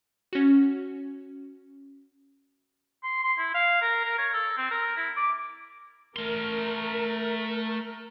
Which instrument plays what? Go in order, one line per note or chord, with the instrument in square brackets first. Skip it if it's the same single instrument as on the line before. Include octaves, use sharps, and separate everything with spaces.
[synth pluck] C#4 F#4
[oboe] C6
C6
E4
F5
A#4
A#4
C#5
A4
C4
A#4
E4
D6
[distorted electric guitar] A3 C6 [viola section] A#4